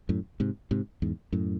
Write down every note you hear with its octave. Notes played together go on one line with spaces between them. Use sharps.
F#2 A2
G#2 C3
G#2 C3
E2 G#2
F#2 A2